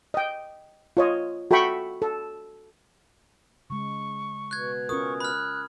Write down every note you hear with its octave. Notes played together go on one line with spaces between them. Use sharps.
D#5 G5
F4 C#5 D#5
F#4 A4 E5 G5 B5 C#6
A4
C#3 G#3 C#6
B2 F#6 G#6
C#4 F4 A#4 C#6 D#6
B5 F6 F#6